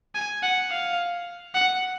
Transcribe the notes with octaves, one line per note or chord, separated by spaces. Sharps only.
G#5
F#5
F5
F#5